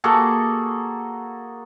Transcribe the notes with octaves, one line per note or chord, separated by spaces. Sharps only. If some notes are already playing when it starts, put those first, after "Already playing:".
A#3 F#4 G#4 A4